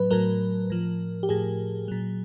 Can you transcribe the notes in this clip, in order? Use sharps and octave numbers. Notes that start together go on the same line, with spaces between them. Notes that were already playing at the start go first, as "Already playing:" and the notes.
Already playing: A2 F#3 B4
A2 F#3 A#4
A2 F3
G4
A2 F3 G#4
A#2 F#3